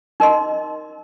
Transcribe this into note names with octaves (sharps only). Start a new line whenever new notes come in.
D#4 A#4 D#5 C6